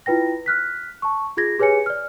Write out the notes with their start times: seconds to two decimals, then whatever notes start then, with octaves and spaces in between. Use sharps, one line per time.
0.06 E4 F4 B4 G5 A#6
0.46 F6 F#6 B6
1.02 A5 C#6
1.37 F4 G#4 G#6 A#6
1.59 G4 G#4 B4 C#5 G#5 C#7
1.86 D5 F6